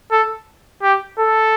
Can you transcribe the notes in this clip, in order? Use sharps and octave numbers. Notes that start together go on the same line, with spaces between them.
A4
G4
A4